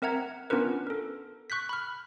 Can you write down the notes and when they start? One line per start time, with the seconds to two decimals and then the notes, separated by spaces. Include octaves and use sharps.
0.02 C4 A#4 E5 F#5 A#5 G#6
0.50 B3 C#4 D4 F4 A#4 B4
0.87 A4 A#4
1.50 C#6 F#6 G6 B6
1.69 B5 F6